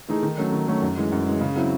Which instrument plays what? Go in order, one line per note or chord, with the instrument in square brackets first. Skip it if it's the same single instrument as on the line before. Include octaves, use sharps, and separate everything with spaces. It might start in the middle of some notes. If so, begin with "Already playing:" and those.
[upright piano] E3 A3 D#4 G#4
D#3
F#3 A3 C#4
D#3
F#3 A3 C#4
F#2
E3 G#3
F#2
E3 G#3
C#3
F#3 C4 E4